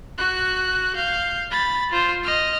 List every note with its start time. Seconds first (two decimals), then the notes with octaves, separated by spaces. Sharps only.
0.18 F#4 F#6
0.95 F5 G6
1.51 B5 A6
1.91 F4 C5
2.23 D#5 F6